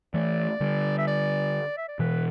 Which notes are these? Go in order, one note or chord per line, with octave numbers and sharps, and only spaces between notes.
E3 A3 D5
D3 G3
E5
D5
E5
D5
B2 E3 B4